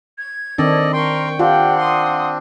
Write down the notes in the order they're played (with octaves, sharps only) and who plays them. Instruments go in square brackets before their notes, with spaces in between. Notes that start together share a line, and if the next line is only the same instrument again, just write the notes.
[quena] G#6
[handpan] D#3 C4 D4 [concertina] A4 D5 D#5
[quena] A#4 [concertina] G5 [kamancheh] C6 C#6
[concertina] C4 D4 [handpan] F4 [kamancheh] G4 G5 [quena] F#5
[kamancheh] C6 D#6